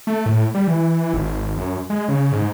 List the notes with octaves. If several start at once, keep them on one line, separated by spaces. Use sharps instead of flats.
A3
A2
G3
E3
G#1
F#2
G#3
C#3
G#2